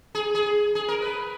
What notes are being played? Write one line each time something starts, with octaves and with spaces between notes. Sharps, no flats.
G#4
G#4
G#4
A#4
B4